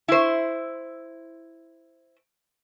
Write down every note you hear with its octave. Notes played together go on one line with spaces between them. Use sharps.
E4 C5